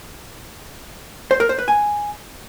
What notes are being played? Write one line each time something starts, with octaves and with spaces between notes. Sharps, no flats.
C5
A#4
C5
B4
G#5